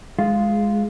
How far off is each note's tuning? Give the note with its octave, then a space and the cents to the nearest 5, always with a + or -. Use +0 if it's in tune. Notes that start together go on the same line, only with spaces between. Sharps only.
G#3 +0 F4 -5